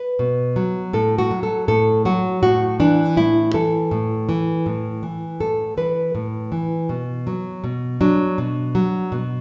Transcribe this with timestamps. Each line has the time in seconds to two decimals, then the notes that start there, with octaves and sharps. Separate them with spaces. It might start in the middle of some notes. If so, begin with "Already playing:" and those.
Already playing: B4
0.19 B2
0.56 F#3
0.93 A2 A4
1.18 F#4
1.31 F#3
1.43 A4
1.68 A2 A4
2.05 F#3 F#4
2.43 A2 F#4
2.80 E3 D4
3.17 A2 E4
3.54 E3 A4
3.91 A2
4.29 E3
4.66 A2
5.03 E3
5.40 A2 A4
5.77 E3 B4
6.15 A2
6.52 E3
6.89 B2
7.27 F#3
7.64 B2
8.01 F#3 D4
8.38 B2
8.75 F#3
9.12 B2